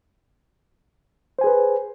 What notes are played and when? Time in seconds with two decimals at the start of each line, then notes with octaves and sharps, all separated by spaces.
1.39 C5
1.41 G#5
1.44 G#4
1.47 B4